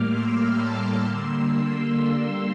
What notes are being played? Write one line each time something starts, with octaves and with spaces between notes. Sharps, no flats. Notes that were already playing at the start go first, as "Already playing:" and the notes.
Already playing: A2 G3 A#3 D6 F6
C6 E6
A5 C6
D3 G3 A#3 C6 E6